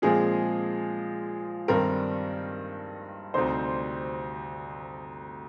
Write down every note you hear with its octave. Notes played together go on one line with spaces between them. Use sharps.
A#2 F3 G#3 C4 G#4
G2 D#3 G3 C4 A#4
D2 C3 G3 C4 D#4 C5